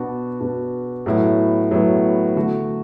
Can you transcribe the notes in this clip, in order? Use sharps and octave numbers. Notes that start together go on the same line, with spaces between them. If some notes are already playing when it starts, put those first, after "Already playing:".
Already playing: B2 B3 D4 F#4
B2 B3 D4 F#4
A2 F#3 B3 E4
A2 F#3 B3 E4
D3 A3 F#4